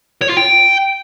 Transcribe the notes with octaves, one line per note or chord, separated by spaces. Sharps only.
C#5
F4
G5